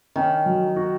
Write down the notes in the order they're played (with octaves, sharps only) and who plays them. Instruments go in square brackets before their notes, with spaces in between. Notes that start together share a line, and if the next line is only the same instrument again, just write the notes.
[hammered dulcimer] D#3 [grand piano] C#4
[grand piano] F#3
F#4